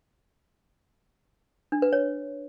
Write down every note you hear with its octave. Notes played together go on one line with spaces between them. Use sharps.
D4
B4
C#5